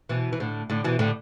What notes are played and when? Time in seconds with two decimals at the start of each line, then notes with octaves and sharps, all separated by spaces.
0.09 B2 E3
0.33 E3
0.40 A2 D3
0.70 A2 D3
0.84 B2 E3
0.99 A2 D3